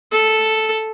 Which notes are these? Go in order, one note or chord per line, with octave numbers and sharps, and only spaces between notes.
A4